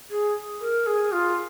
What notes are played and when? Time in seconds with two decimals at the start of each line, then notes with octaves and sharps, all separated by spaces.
0.10 G#4
0.61 A#4
0.86 G#4
1.12 F4